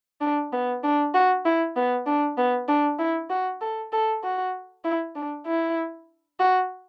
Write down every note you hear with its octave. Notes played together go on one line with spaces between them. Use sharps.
D4
B3
D4
F#4
E4
B3
D4
B3
D4
E4
F#4
A4
A4
F#4
E4
D4
E4
F#4